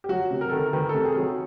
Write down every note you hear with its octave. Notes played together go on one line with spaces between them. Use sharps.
G4
F#3 F#4
C3
A#4
A4
D#3 A#4
D#3 B4
A4
C3
G#4
F#3